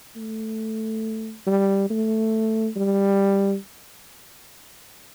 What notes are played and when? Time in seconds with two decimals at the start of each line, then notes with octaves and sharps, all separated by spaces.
0.16 A3
1.47 G3
1.90 A3
2.77 G3